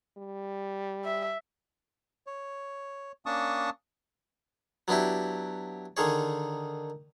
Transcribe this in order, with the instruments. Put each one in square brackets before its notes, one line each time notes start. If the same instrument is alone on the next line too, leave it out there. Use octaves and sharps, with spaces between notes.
[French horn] G3
[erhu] E5
[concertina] C#5
A#3 C#4 D4 A5 C#6 D#6
[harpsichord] F#3 B3 D4 E4 G4
D3 D#3 G#4 C#5